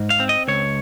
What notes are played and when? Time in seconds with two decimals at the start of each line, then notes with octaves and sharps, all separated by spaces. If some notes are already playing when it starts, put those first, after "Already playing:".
Already playing: G#2
0.10 F5
0.20 C4
0.29 D#5
0.48 C#2 C#5